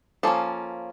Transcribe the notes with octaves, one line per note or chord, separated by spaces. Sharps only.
F3 A#3 C#4 A4